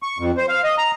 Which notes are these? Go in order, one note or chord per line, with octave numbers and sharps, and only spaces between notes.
C#6
F2
C5
F5
D#5
A#5